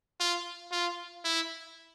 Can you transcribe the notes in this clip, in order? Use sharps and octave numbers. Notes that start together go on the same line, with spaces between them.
F4
F4
E4